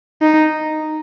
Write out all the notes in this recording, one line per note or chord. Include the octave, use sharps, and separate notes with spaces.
D#4